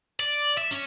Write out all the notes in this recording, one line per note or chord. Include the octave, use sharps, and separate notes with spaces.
D5
E5
C#4